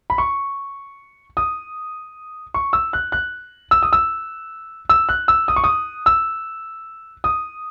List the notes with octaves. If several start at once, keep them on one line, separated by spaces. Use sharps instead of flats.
B5
C#6
D#6
C#6
E6
F#6
F#6
E6
D#6
E6
E6
F#6
E6
D#6
C#6
D#6
E6
D#6